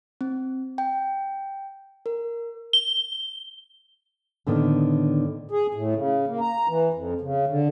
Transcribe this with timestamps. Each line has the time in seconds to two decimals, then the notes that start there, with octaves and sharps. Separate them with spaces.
0.21 C4
0.78 G5
2.06 A#4
2.73 G7
4.47 A2 D3 D#3 B3
5.51 G#4
5.74 A2
5.95 C#3
6.27 A#3
6.40 A#5
6.68 E3
6.93 F2
7.21 C#3
7.47 D3